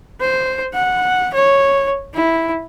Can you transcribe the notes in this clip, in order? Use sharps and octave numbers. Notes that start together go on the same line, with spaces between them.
C5
F#5
C#5
E4